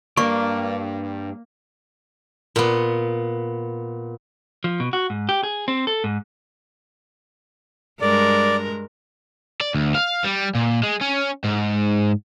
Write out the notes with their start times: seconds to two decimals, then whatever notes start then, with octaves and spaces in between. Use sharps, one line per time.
0.17 G2 A#3 D5 C#6
2.56 A#2 B3
4.64 F3
4.80 B2
4.93 F#4
5.10 G#2
5.29 G4
5.43 G#4
5.68 C4
5.87 A4
6.04 G#2
8.01 G2 G#3 A#4 D5
9.61 D5
9.75 D2
9.95 F5
10.24 G3
10.55 A#2
10.83 G#3
11.01 C#4
11.44 G#2